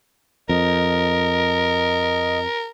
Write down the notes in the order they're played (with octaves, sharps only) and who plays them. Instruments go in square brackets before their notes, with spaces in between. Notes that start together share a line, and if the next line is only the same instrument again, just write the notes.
[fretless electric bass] F2 [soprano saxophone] A#4 [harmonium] D#5